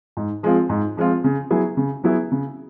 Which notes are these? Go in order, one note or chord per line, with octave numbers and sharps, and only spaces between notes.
G#2
F3 G#3 C4 F4
G#2
F3 G#3 C4 F4
C#3
F#3 B3 E4 G#4
C#3
F#3 B3 E4 G#4
C#3